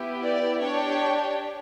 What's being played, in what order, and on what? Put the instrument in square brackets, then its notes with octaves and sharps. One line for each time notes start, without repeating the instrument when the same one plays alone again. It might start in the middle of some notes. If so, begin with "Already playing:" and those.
Already playing: [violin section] B3 E4 G4
D5
D4 G4 C#5